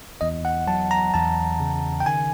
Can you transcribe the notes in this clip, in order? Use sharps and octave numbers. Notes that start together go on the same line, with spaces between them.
E2 D#5
F#5
F#3 A5
A#5
E2 A5
C#3
G5
D#3 G#5